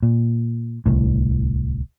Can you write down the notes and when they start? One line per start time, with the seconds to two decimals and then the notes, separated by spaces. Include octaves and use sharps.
0.03 A#2
0.86 D1 C2 A2